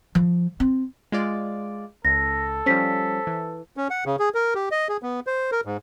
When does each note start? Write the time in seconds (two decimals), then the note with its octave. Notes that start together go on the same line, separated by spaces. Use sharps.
0.15 F3
0.60 C4
1.12 G#3 F4 D5
2.05 C#2 A4 A#6
2.66 F3 G3 C#4 C5 B6
3.27 E3
3.77 C#4
3.90 F#5
4.06 C#3
4.19 G#4
4.35 A#4
4.55 G4
4.71 D#5
4.89 G#4
5.03 B3
5.27 C5
5.52 A#4
5.65 G#2